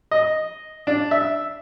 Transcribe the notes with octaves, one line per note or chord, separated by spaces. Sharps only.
D#5
D4
E5